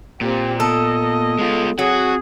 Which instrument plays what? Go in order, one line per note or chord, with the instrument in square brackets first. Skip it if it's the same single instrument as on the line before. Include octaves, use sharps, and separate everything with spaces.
[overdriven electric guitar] A#2 [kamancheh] C4 G4
[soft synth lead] B3 [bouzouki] A4 [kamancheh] D#5
[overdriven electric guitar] G#3 F4
[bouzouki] F#3 [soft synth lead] C4 [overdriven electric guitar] F#4 [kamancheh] G#4